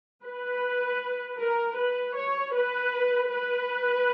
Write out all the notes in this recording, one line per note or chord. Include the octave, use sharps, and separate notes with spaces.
B4
A#4
B4
C#5
B4
B4